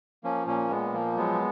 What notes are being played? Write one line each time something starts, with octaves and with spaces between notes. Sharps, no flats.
F3 A#3 C#4
A#2 A#3 C#4
A#2 G#3 B3
F3 A#3
F#3 G#3 B3